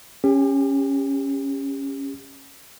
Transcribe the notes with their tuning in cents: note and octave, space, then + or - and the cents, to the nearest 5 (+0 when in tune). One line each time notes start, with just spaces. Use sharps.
C#4 -5 G4 +30